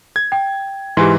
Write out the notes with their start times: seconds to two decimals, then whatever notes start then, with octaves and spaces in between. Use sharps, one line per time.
0.16 G#6
0.32 G5
0.97 G#2 E3 G4 G#5 C6